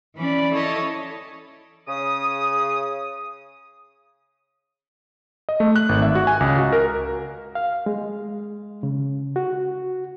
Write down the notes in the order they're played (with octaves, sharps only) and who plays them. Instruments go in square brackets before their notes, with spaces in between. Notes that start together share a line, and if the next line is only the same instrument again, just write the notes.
[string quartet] E3 C#4 D5 B5
E4 A4 C#5 D#5 A5
[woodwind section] C#3 D#6
[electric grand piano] D#5
A3
F#6
G#1
E5
F#4
G#5
C#2
F#4
A#4
[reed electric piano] F5
G#3
C#3
F#4